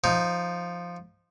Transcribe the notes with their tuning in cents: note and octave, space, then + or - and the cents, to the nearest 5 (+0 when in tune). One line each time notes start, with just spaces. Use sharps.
F3 +0 D#4 +0